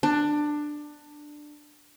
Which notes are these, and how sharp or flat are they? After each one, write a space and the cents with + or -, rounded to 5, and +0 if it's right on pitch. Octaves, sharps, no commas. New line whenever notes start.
D4 +15